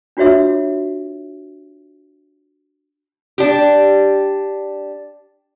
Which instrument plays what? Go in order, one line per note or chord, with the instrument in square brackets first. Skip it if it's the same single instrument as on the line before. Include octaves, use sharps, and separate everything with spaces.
[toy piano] D4 F4 F#4 C#5 E5 D6
[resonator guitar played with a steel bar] D4 G4